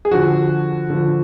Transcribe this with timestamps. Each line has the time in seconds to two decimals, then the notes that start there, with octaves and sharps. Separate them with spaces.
0.05 G#4
0.11 D3 F3 F#4
0.90 D3 F3